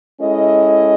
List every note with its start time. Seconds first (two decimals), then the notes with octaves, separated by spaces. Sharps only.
0.20 G#3 C#4 E4 A4 D#5